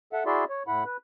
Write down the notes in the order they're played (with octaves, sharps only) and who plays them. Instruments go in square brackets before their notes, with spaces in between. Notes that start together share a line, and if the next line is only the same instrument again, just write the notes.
[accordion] A4 E5 F#5
E4 F#4 G#4 D5 E5 C6
C#5
A2 E4 F#5 B5
B4